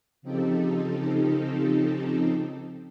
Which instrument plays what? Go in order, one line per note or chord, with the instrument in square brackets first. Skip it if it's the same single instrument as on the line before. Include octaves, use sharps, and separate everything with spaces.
[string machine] C#3 F3 C4 D#4 G4 A4